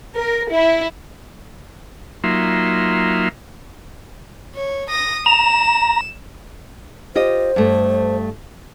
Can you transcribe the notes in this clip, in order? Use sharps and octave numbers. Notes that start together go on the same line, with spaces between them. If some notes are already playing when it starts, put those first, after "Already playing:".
A#4
E4
F#3 A#3 D#4 F4 E5 C6
C#5
D#6 A#6
A#5 E7
F4 G4 C5 D#5
G2 A3